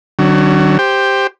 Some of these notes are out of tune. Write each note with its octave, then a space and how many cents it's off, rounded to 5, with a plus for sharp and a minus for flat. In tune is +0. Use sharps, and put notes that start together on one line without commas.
D3 +35 F#3 +25 C#4 +0
G4 +5 C5 +0